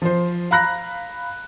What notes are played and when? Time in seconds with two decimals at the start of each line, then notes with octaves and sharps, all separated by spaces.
0.02 F3 C5
0.51 F5 A#5 B5 F#6 A#6